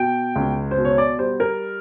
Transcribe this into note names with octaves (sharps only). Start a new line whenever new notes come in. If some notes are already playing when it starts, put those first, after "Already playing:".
Already playing: B2 G5
C#2
C5
B2
C#5
D5
G3 C5
A#4